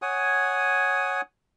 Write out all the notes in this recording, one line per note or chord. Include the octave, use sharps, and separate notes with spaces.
C#5 F#5 G#5 D#6